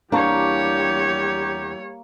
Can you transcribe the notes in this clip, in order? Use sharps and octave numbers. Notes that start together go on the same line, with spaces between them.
E2 G3 A#3 D4 G4 C#5 C#6